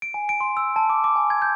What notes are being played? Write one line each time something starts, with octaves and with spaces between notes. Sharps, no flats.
D7
G#5
D7
C6
E6
A5
D6
D6
G#5
G#6
G6